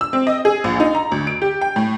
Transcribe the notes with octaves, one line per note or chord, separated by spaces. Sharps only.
E6
C4
D#5
G#4
A#1
D#4
A#5
D2
D7
G4
G5
A2